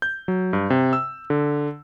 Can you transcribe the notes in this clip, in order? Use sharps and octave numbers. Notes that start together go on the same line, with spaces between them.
G6
F#3
G2
C3
E6
D3